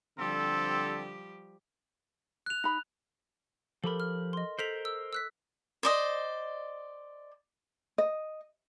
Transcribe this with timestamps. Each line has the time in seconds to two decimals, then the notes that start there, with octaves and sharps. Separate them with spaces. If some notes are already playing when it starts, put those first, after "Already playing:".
0.19 D3 F3 G3 C4 G4 A4
2.46 F#6 F7
2.64 D#4 B5
3.84 F3 G4 A4 A#4 B5
4.00 F6
4.33 D#5 C6
4.59 A4 A#4 C5 B6 F7
4.85 E6
5.13 E6 F#6 B6
5.83 C5 D5 D#5
7.98 D#5